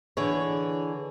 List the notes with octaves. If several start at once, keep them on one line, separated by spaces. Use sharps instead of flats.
D3 E3 G#4 C#5